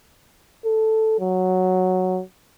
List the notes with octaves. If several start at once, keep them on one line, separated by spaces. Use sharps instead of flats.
A4
F#3